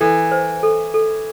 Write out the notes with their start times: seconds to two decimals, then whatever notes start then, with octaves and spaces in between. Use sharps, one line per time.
0.01 E3 A4
0.32 C5
0.63 A4
0.94 A4